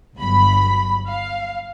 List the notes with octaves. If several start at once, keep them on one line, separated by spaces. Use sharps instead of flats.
G1 F#3 B5
F5